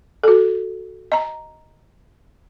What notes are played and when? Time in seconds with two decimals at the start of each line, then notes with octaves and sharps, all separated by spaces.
0.24 F#4 A4
1.12 D#5 A#5